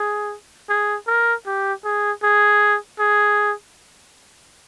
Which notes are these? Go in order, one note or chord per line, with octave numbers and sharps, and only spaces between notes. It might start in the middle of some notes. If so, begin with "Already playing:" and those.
Already playing: G#4
G#4
A#4
G4
G#4
G#4
G#4